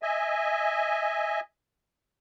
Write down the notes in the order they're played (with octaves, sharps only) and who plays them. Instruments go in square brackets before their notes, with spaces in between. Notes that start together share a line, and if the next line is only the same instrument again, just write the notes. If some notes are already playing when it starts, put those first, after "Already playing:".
[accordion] D#5 E5 G#5